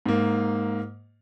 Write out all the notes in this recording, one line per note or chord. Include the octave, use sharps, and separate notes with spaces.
G#2 A#3